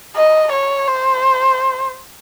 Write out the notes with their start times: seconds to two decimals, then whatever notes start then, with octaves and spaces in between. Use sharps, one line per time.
0.16 D#5
0.52 C#5
0.88 C5